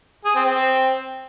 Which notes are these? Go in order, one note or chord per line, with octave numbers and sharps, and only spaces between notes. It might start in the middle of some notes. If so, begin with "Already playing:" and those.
G#4
C4
C4